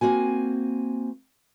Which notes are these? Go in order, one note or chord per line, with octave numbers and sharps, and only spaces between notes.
A#3 C4 F#4 G#5